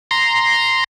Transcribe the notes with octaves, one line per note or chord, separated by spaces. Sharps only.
A#5 C6